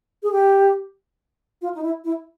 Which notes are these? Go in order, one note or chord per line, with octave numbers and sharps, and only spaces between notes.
G#4
G4
F4
D#4
E4
E4